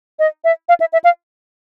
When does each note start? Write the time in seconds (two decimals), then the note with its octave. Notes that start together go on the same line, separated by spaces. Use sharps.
0.19 D#5
0.44 E5
0.69 F5
0.80 E5
0.93 E5
1.04 F5